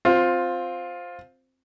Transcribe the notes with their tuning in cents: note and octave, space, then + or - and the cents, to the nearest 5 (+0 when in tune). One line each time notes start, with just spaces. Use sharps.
C4 +0 F4 +15